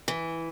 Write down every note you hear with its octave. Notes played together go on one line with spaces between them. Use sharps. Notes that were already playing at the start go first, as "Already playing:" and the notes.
E3